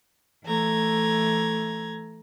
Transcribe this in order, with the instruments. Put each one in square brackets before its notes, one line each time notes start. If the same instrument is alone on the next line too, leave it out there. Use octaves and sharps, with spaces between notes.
[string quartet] E3 A3 A#5 G#6